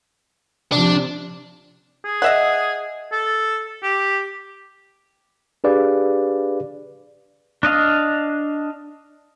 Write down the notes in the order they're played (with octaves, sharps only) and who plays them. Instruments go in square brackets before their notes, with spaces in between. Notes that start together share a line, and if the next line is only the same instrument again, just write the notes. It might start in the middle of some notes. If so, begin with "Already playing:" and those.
[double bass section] C3 F3 [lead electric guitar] D4
[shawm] G#4
[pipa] D#5 E5 F#5
[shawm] A4
G4
[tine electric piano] D4 G4 G#4 B4 D5 F5
[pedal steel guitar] D4 D#5 F5